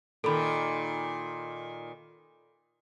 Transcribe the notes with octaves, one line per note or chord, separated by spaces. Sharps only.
A#2 D#3 A4 B5